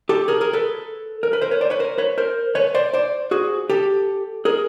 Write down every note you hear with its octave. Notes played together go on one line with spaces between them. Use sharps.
G4 A4
G#4 A#4
G#4 A#4
A4 B4
A#4
B4
A#4 C5
B4 C#5
C5 D5
B4 C#5
A#4 C5
B4 C#5
A#4 C5
B4 C#5
C5 D5
C5 D5
F#4 G#4
G4 A4
G#4 A#4